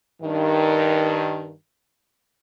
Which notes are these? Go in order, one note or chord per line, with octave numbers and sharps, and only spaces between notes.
G2 D#3